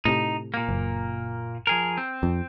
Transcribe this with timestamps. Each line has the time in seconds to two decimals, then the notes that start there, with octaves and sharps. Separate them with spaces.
0.05 A2 C3 D#4
0.54 A#2 A#3
0.69 F#1
1.67 F3 G#4 A#4
1.97 C4
2.23 F2